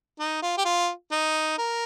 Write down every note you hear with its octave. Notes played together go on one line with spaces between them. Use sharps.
D#4
F4
G4
F4
D#4
A#4